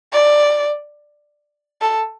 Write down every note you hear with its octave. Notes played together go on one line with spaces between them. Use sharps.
D5
A4